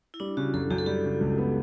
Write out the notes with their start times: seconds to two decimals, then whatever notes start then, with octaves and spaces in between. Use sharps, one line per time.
0.14 E4
0.20 G3 D4
0.37 C#3 F#4
0.54 F#2 A4
0.70 F#2 G4
0.78 A4
0.86 G3 G4
1.04 C#3
1.21 C#2
1.38 B3